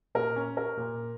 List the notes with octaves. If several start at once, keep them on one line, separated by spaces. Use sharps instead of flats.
A#2 A#4
C#4
A#4
A#2